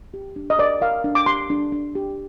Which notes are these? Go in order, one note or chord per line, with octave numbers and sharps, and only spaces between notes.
G4
D4
D#5
A#4 D5
A#4 F5
D4
D6
G4 C6
D4
D4
G4